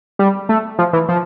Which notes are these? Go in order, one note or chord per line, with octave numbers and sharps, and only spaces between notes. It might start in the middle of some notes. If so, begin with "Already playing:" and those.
G3
A3
F3
E3
F3